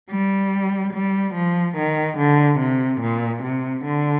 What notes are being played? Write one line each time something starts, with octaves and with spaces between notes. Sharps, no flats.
G3
G3
F3
D#3
D3
C3
A#2
C3
D3